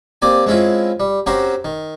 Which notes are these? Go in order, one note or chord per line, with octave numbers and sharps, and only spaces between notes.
A#3 C4 G4 D5 G#5
G#3 C4 C#4 E4 F4
G3
C4 C#4 F#4 G4 A#4 C5
D#3